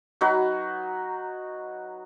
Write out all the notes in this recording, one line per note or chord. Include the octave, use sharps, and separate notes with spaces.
F#3 D#4 F#4 B4